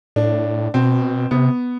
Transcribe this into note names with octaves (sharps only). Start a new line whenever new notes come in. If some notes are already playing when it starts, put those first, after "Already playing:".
A2 D4
B2 C4
C3 B3